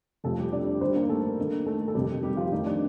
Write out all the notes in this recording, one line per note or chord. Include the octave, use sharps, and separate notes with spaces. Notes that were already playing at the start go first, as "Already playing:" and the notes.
F2 C3 F3 A3 A4
G3 G4
D4 D5
G2 D#3 G3 C4 C5
A#3 A#4
A3 A4
G2 D#3 A#3
A3 A4
A4
F2 C3 D#3 G3 G4
G3 G4
F3 F4
F2 D#3 A3 D#4
D4